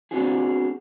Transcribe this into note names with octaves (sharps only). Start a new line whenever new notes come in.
B3 C4 D4 F#4 G#4